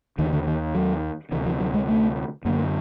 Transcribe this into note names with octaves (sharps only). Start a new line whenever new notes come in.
D#2 D3 D#3
D3
D#3
F#3
D2 C3 E3
F3
F#3
G#3
A3
F#2 D3 A#3